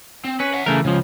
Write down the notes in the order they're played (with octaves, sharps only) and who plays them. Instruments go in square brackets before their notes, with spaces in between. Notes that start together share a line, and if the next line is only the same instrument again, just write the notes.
[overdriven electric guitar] C4
[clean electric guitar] C#4 [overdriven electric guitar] B4
[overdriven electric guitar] E5 F#5
[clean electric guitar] C#3 A3 A#4 [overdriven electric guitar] E3
[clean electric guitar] C#2 F3 [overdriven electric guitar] C#3